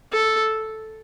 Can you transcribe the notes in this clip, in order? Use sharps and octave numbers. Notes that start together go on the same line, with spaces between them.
A4